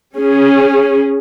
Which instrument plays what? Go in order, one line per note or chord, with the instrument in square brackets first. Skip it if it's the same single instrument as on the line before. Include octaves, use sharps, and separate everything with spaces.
[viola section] C#4 G#4